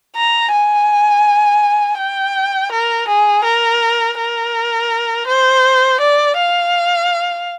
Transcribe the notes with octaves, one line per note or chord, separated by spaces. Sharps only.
A#5
G#5
G5
A#4
G#4
A#4
A#4
C5
D5
F5